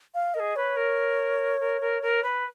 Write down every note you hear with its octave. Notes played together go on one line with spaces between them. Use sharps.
F5
G#4 A#4 D#5
B4 C#5
A#4
A#4
A#4
A#4
B4